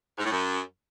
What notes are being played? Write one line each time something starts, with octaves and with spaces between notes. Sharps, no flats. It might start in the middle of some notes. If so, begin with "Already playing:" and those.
G#2
A2
F#2